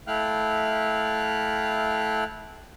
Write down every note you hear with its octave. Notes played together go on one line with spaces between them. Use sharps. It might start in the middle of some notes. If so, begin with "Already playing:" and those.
A3 E4 F5 G5 F6 F#6